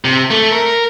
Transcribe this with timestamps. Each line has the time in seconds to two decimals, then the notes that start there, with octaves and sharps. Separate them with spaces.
0.05 C3
0.30 A3
0.52 A#4